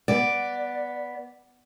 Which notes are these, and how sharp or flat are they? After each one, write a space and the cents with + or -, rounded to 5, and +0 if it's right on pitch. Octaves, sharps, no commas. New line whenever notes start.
B3 -5 D5 +0